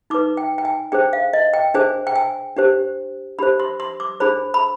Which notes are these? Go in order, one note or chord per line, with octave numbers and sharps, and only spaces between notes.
D#4 B4 D6
G5
G5
G#5
D4 G#4 C5 G5
F5
D#5
G5
D4 G#4 C5 G#5
G5
G#5
D4 G4 C5
D4 G4 C5 B5
C6
C6
D6
D4 G#4 C5 B5
B5